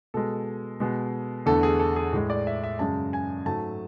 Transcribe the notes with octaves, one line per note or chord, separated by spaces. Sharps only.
B2 G#3 A4
B2 G#3
E2 D3 A3 A4
G#4
A4
G#4
A2 G#3
D5
E5
E5
F#2 C#3 G#3 A5
G#5
G#2 F#3 A3 A5